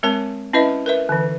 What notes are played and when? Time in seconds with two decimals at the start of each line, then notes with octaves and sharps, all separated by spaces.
0.03 G#3 C4 A#4 C#5 A5
0.53 C#4 E4 B4 D#5 E5
0.86 A#4 B4 E5
1.09 D3 E3